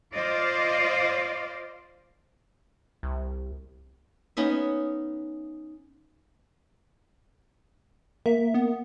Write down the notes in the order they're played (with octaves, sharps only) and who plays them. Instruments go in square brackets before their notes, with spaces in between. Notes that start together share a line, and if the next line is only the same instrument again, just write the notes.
[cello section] F4 C5 D5 D#5 F5
[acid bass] C2
[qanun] B3 C#4 D#4 E5
[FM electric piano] A#3 [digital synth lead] E5
[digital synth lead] B3